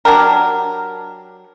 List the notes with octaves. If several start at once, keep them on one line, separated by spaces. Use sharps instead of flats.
F#3 D4 G4 A#4